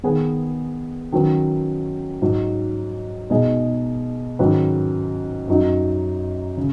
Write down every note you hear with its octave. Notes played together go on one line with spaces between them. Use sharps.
D#3 B3 G#4 B4
D#3 F#3 C#4 B4
G#2 F#3 D#4
B2 G#3 D#4 G#4 D#5
G#2 D#3 F#3 C#4 B4
F#2 F#3 D#4
C#3